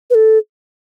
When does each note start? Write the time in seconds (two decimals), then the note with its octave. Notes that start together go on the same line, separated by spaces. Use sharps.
0.10 B4
0.15 A4